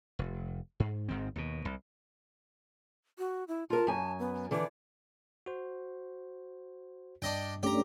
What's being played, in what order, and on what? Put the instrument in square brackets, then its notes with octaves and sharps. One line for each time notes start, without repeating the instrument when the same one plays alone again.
[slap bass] F1
G#2
G#1 G#2 D#3 C4
D#2 B2
C2
[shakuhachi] F#4
E4
[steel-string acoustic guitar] F4 A#4 [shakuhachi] A5
[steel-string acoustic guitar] F#2 G#5
[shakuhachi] B3
[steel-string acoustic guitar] D3 E3 [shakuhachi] D5
[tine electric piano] F#4 C5
[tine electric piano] G2 [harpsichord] D4 D#5 G5
[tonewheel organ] A3 C#4 D4 [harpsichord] G4 A#5